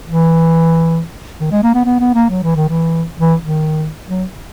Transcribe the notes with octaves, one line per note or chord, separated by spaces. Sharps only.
E3
D#3
G#3
A#3
B3
B3
B3
A#3
F#3
E3
D#3
E3
E3
D#3
F#3